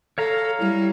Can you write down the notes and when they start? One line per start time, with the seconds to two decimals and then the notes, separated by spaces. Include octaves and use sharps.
0.18 A4 C#5 F5 A#5
0.60 G3 E4